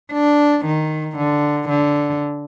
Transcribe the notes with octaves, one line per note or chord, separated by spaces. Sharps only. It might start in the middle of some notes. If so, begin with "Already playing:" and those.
D4
D#3
D3
D3